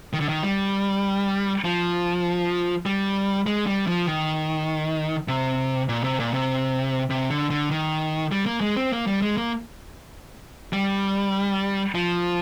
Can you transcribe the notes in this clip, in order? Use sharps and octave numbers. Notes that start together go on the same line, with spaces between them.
D#3
D3
D#3
G3
F3
G3
G#3
G3
F3
D#3
C3
A#2
C3
A#2
C3
C3
D3
D3
D#3
G3
A#3
G#3
C4
A#3
G3
G#3
A#3
G3
F3